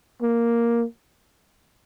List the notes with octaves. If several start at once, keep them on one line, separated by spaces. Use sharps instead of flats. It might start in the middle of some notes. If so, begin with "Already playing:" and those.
A#3